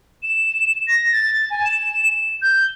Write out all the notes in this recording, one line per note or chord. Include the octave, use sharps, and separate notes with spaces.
E7
A#6
A6
G#5
E7
G6